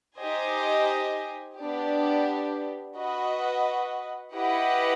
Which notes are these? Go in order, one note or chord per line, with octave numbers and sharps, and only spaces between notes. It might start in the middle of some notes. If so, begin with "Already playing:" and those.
D#4 G4 C5 D#5 G#5
B3 D4 G4
F#4 B4 D#5
E4 G4 B4 D#5 F#5